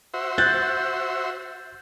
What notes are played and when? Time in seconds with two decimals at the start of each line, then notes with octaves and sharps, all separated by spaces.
0.14 F#4 C5 E5
0.38 F#6 G6 A6